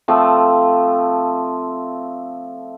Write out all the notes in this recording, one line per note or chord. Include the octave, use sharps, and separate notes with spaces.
F3 A3 C4